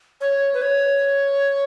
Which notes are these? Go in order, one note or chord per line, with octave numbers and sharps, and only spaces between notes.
C#5
B4
C#5